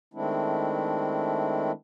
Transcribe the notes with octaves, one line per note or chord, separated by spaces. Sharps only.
D#3 G#3 A3 C4 D4 E4